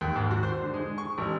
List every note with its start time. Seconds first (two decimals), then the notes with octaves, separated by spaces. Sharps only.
0.01 D#2
0.16 G#2
0.31 F#4
0.43 C5
0.62 D3
0.74 G#3
0.98 C#6
1.18 A1